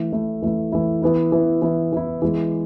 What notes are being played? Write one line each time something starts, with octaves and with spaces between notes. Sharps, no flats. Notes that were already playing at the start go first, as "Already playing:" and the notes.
Already playing: E3 A3 E4
E3 A3 E4
E3 A3 E4
E3 A3 E4
E3 B3 E4
E3 B3 E4
E3 B3 E4
E3 B3 E4
E3 G#3 B3